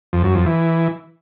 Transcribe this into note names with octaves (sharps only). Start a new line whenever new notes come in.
F2
F#2
F2
E3